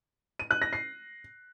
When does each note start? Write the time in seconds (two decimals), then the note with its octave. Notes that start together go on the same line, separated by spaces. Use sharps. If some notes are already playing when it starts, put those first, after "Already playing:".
0.39 D#7
0.51 F#6
0.62 A#6
0.73 C7